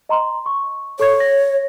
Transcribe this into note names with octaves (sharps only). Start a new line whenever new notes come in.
D#5 A#5 C6
C#6
A4 C#5 C#6 G#6
A#6